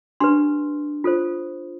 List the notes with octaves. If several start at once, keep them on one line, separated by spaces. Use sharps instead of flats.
D4 G4 B4 C6
F4 A4 C5